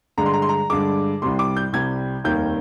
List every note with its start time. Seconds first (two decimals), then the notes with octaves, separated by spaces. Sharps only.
0.18 G2 D3 G#3 A#5
0.26 C6
0.33 A#5
0.42 C6
0.49 A#5
0.70 G2 D3 G#3 D6
1.22 C2 C3 G3 C6
1.39 D6
1.56 G6
1.73 C2 C3 G3 G#6
2.24 F1 D#2 D#3 G3 A#3 G6